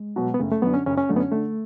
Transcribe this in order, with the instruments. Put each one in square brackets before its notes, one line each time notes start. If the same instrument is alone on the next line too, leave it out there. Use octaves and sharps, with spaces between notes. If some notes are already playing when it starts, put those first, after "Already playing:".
Already playing: [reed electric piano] G#3
[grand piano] B2 F#3 B3
[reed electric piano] B3
[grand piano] F#1 [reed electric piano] A3
[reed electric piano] A3
[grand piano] F#2 D3 [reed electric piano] B3
[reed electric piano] C#4
[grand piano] F#1 [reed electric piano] C#4
[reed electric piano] C#4
[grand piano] F#2 D3 [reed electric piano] A3
[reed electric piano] B3
C#4
[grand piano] D3 [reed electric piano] A3